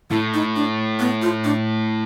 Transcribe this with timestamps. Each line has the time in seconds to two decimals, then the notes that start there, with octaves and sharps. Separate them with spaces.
0.11 A2 E4
0.34 D#4
0.56 D4
1.00 B3
1.22 F4
1.44 D4